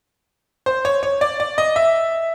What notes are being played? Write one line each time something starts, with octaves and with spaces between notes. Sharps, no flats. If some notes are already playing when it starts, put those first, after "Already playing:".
C5
C#5
C#5
D5
D5
D#5
E5